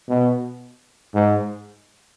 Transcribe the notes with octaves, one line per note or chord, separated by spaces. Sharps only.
B2
G#2